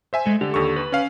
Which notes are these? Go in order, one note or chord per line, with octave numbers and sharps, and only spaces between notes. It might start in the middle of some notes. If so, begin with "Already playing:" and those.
C5 E5 G#5
G#3 A3
D3 G4 A4
D#2 D3 C#6
B4
C#4 F5